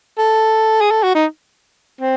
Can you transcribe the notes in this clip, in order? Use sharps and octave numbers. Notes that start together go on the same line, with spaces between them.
A4
G#4
A4
F#4
D#4
C4